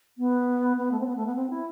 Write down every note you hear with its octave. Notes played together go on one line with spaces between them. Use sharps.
B3
B3
A3
C4
B3
A3
B3
C4
E4